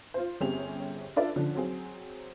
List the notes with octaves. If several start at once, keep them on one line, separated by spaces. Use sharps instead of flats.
F4 C5
G1 C4 C#4 G4 G#4 F7
D4 F4 A4 B4 D5 E5
D3 F3 C#4 D4
F#3 C4 G#4